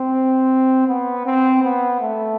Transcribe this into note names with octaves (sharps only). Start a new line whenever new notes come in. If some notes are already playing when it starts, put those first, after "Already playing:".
Already playing: C4
B3
C4
B3
A3